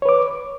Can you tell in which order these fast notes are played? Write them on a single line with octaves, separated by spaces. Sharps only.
C#5 B4 D6